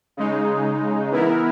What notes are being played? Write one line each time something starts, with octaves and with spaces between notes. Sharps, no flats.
C#3 G#3 D#4
E3 B3 E4 A#4